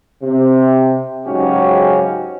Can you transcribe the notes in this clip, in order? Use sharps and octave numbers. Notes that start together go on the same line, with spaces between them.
C3
G#2 C#3 F#3 C#4 F#4 G4